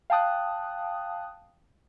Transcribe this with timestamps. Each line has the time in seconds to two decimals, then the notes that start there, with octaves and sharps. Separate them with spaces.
0.10 F5 G5 A5 D#6 F#6